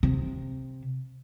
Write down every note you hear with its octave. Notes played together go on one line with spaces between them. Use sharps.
C3